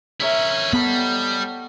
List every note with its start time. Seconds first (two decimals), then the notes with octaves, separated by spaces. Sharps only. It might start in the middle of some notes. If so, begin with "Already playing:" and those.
0.20 C#4 E4 A#4 C#5 E5
0.73 G3 B3 A4 D#5 F#5 B5